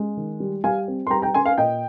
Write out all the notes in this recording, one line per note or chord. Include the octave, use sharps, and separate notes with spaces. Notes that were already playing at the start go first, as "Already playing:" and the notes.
Already playing: G#3 C#4
D#3
G3
G3 F5 G#5
C4
C6
G3 G5 A#5
G5 A#5
C#4 G#5 C6
F5 G#5
A#2 D#5 G5